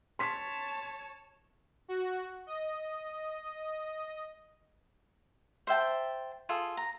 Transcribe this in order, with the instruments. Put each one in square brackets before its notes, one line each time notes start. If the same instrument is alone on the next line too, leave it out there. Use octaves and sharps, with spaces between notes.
[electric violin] C#5 A5 [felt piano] C6 B6
[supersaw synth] F#4
D#5
[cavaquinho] C5 E5 G5 A5
F4 G#4 A4
A#5